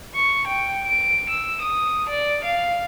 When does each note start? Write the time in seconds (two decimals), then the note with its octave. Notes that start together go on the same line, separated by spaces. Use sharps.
0.15 C#6
0.47 G5
0.86 D7
1.30 E6
1.62 D#6
2.09 D5
2.45 F5